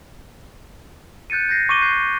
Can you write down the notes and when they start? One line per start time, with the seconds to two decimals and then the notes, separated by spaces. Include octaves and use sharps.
1.30 F#6 G6 A6 C#7 D#7
1.49 G6 A6 A#6 C7
1.69 C#6 D6 D#7 G7
1.82 F#6 G6 C7 D#7